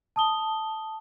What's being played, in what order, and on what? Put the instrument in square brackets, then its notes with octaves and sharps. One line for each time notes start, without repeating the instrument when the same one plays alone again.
[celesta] A5 D#6 G7